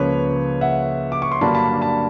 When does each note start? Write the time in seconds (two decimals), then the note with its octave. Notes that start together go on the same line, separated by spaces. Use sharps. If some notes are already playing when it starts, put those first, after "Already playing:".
Already playing: C#2 C#3 F3 A#3 B4 C#5
0.61 E5 F#5
1.12 D6
1.22 C#6
1.32 C6
1.41 G2 D3 F#3 A#3 D4 A5 B5
1.55 A5 B5
1.81 A5 B5